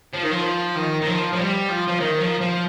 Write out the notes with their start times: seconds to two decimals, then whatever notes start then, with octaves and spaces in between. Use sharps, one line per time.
0.13 F3
0.23 D#3
0.31 F3
0.76 D#3
1.01 D#3
1.07 F3
1.33 F3
1.38 G3
1.69 F3
1.87 F3
2.00 D#3
2.20 F3
2.41 F3